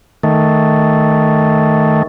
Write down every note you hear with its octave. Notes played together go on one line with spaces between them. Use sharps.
D#3 A3